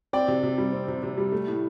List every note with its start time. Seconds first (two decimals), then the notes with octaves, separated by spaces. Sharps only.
0.13 C4 D5 G5
0.28 C3
0.43 C3
0.58 G3
0.73 C4
0.88 C3
1.03 C3
1.18 G3
1.32 A3
1.47 A2